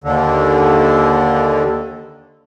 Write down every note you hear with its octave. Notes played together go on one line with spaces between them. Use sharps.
D#2 D3